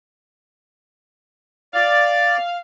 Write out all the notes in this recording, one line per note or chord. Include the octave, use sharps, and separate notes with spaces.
D5 F5